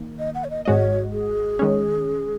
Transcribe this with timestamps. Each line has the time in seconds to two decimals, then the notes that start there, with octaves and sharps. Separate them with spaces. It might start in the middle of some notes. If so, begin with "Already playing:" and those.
Already playing: D#3 A#3
0.19 D#5
0.35 F#5
0.44 C#5
0.50 D#5
0.65 G#1 G#2 G#3 F#4 C#5 D#5
1.13 G#4
1.59 D#3 G#3 C#4